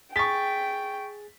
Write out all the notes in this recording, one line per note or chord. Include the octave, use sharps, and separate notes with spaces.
G#4 G5 C#6 A6 B6